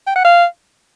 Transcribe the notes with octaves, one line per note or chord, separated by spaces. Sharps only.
G5
F#5
F5